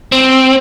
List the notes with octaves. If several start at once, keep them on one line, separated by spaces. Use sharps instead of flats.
C4